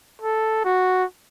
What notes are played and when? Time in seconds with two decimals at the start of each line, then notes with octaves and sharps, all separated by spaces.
0.22 A4
0.65 F#4